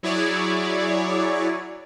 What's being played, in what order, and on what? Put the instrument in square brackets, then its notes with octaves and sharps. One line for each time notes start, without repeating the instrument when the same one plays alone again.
[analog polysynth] F#3 E4 G#4 C#5 D5